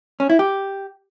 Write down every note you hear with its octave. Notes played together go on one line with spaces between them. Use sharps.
C#4
E4
G4